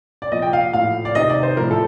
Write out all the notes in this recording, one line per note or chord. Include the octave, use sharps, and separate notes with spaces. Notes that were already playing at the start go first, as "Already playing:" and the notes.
D5
A#2 F3 D#5
G5
F5
A2 F3 F5
D5
C3 D#3 D#5
D5
C5
A2 F3 A#4
A4